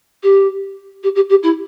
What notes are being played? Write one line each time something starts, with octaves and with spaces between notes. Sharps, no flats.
G4
G4
G4
G4
E4